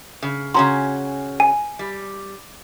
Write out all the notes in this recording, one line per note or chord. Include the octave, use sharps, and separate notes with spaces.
C#3
C#3 C#4 F#4 A#5 C6
G#5
G3